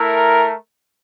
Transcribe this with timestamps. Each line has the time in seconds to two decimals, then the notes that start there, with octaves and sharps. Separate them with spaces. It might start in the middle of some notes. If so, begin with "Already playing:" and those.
Already playing: A3 E4 A#4